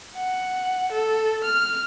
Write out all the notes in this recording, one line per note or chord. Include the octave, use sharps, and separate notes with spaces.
F#5
A4
F6